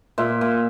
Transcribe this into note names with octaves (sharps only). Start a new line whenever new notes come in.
A#2 E5
A#2